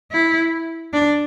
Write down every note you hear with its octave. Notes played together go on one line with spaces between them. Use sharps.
E4
D4